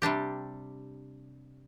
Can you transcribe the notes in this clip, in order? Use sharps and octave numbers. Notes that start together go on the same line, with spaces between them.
C3 G3 D4 G4